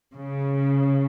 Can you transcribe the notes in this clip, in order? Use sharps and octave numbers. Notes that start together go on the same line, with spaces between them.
C#3